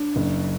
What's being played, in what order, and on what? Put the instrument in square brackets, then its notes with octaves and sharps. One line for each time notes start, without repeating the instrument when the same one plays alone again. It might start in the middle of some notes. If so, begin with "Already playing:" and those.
Already playing: [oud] D4
[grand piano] F#1